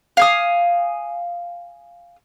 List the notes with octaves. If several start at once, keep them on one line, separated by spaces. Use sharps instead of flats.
F5 G#5 D#6